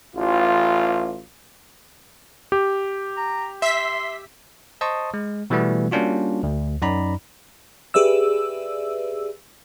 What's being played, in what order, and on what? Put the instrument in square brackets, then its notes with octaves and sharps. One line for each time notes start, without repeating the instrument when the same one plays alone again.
[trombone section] A1 F4
[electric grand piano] G4
[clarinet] A#5
[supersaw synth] E5 B6 [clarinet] C6
[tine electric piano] C5 D#5 A5 C6 C#6 D#6
G#3
B2 E3 G3 A3 B3
G3 A#3 C#4 D4 F4 F#4
D2
F#2 D#4 D5 A#5 B5
[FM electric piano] G4 G#4 B4 D5 E5 E6